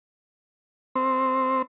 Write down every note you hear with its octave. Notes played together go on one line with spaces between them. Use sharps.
C4